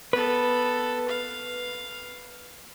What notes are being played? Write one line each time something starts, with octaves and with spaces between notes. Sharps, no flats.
B3 A4 B4
F5